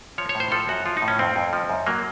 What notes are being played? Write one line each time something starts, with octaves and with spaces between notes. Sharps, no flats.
F3 C#5
C#5
A2
C5
F3 A4
F#2 F#4
F3 F4
D#4
A2
C#4
F2 C4
F2
F3
F#2
F#3 A#3